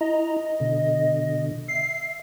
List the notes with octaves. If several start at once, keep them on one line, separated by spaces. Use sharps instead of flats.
E4 D#5 A#5
B2 D3
E5 C7